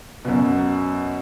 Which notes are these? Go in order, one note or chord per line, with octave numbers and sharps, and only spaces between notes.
F#2 B2